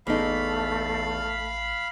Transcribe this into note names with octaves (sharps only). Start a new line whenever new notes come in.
A1 E2 A3 D#4 F5 B5